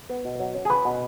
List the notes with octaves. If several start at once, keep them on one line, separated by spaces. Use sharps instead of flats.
B3
B2
F#3
C#4
G#4
C#4 B4
B2